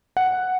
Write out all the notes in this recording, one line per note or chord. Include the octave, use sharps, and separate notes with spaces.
F#5